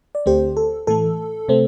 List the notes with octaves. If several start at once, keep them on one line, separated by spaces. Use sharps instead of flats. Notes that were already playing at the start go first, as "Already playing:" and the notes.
D5
D2 D3 A3 C4 G4 C5
A4
A2 E3 A3 A4
C3 A3 C4